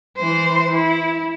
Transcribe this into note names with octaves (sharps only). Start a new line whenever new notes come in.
E3 C5
E4